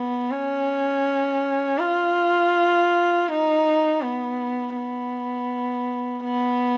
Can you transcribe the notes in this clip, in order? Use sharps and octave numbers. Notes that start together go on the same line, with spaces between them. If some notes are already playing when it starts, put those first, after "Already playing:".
Already playing: B3
C#4
F4
D#4
B3
B3
B3